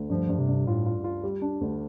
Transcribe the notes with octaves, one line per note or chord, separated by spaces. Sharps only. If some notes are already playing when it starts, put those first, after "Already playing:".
Already playing: D2
G2 F3
G2
C3
G2
A2 F4
F4
F4
G3
D4
D2